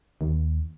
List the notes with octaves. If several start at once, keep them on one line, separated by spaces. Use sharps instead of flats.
D#2